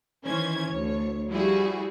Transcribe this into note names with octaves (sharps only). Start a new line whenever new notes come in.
D#3 E3 C#4 C5 G#6
D2 C#5
F3 G3 E4 F#4 G#4